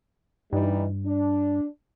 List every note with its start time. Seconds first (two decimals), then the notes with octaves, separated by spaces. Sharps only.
0.53 G2 E3 G3 D#4
1.06 D4